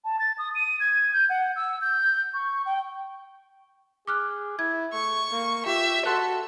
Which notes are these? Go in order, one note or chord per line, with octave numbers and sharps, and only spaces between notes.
A5
A6
D#6
D#7
G#6
G6
F#5
E6
G6
C#6
G5
G#4 D6 F6 F#6
E4 G#6
A3 C#6
A#3
F4 G4 E5
F#4 A4 C6 F#6